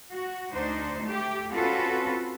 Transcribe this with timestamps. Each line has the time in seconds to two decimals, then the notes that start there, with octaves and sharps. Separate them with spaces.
0.13 F#4
0.53 D2 D4 D#4 C5
1.03 A3 G4
1.53 C4 C#4 F4 F#4 A4 B4